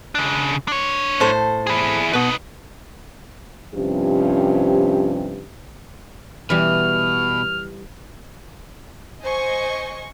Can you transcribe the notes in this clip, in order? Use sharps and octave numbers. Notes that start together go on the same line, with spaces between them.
C#3 D4
D4 C#5
A2 A4 C5
E4 G#4
B2 B3 D#4 B4
G2 C3 F3 C#4 G4
B2 E3 G3 F6
C5 D#5 G#5 C#6